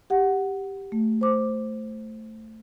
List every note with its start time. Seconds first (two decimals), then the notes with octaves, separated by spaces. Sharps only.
0.10 G4 F#5
0.92 A3
1.21 C5 D6